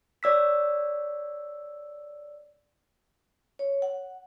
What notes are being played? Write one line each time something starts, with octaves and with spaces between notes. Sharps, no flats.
C#5 D5 E6 B6
C#5
F#5